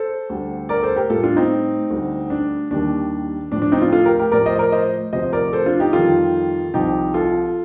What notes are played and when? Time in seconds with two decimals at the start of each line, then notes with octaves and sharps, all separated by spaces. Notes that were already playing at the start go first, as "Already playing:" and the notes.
Already playing: A4 C5
0.30 D2 D3 G3
0.69 A#4 D5
0.83 A4 C5
0.96 G4 A#4
1.10 A2 G3 F4 A4
1.23 D4 F4
1.36 C4 D#4
1.90 D2 D3 G3
2.30 D4
2.71 D#2 D#3 G3 D4
3.52 A2 F3 D4
3.62 D4
3.72 C4 D#4
3.82 D4 F4
3.92 F4 A4
4.05 G4 A#4
4.19 G4 A#4
4.32 A2 F3 A#4 D5
4.46 C5 D#5
4.59 A#4 D5
4.72 C5 D#5
5.13 D2 C3 F3 C5 D#5
5.33 A#4 D5
5.53 A4 C5
5.66 D4 F4
5.80 D#4 G4
5.93 F2 D#3 G3 F4 A4
6.74 C2 C3 F3 D#4 G4
7.14 F4 A4